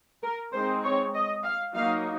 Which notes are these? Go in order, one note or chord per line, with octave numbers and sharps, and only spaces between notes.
A#4
G#3 C4 D#4 C5
C#5
D#5
F5
F#3 A#3 D#4 F5